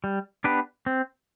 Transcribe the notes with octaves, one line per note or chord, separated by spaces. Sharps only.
G3
B3 D4 G4 B4
C4